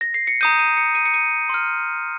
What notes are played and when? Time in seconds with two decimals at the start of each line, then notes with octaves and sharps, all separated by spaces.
0.01 A#6
0.14 C7
0.27 C#7
0.41 A#5 D#6 G6 D#7
0.59 D#7
0.77 C#7
0.95 D#7
1.05 C#7
1.14 D#7
1.49 C6 F6